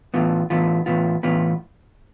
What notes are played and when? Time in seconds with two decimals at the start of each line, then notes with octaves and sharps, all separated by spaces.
0.14 A2 E3 B3 F4
0.50 A2 E3 B3 F4
0.86 A2 E3 B3 F4
1.23 A2 E3 B3 F4